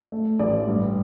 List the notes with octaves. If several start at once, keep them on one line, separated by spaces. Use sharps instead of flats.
A3
A1 D5
G2